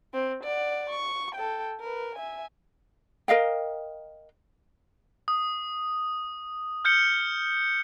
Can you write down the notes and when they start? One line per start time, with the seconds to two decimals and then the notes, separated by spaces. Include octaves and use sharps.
0.14 C4
0.44 D5 F#5
0.90 C#6
1.35 A4 G5
1.80 A#4 B4
2.15 E5 G#5
3.28 A#4 D#5 F5 G5
5.28 D#6
6.85 F6 G6 C#7 G7